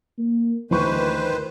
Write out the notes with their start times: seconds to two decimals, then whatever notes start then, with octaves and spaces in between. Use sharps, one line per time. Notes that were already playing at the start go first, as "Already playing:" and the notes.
0.18 A#3
0.71 D2 D#3 E3 B4 C5 C#6